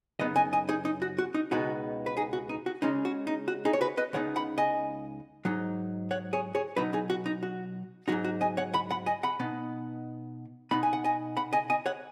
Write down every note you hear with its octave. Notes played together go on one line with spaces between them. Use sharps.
F#2 C#3 B3 D#4 B4 D#5
D#5 G#5
D#5 G#5
D#4 G#4
D#4
F#4
F#4
D#4
C#2 B2 G#3 B3 D#4 F#4
B4
D#4 G#4
F#4
D#4
F#4
C#3 G#3 C#4 D#4
F#4
D#4
F#4
D#4 G#4
C#5
F#4 B4
B4 D#5
C#2 C#3 B3 D#4 C#5 F#5
F#5 B5
D#5 G#5
G#2 F#3 D#4
C#5 F#5
G#4 C#5
G#4 C#5
B2 F#3 D#4 F#4 B4
D#4 G#4
F#4
D#4
F#4
G#2 F#3 D#4 F#4
F#4
D#5 G#5
C#5 F#5
F#5 B5
F#5 B5
D#5 G#5
F#5 B5
B2 B3 D#4
B2 B3 D#4 B5
G#5
F#5
D#5 G#5
F#5 B5
D#5 G#5
D#5 G#5
C#5 F#5